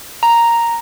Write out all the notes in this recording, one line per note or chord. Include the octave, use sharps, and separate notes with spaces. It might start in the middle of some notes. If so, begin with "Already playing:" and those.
A#5